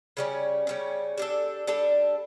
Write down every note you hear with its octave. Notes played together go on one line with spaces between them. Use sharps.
C#3 G3 C#4
C#3 G3 C#4
G3 D4 A4
G3 D4 A4